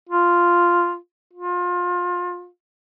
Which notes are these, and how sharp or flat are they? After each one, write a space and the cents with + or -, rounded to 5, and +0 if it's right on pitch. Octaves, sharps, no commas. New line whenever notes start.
F4 -5
F4 +25